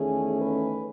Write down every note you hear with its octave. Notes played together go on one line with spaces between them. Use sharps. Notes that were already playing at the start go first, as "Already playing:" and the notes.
Already playing: E2 D#3 A3 C#4 G#4
B4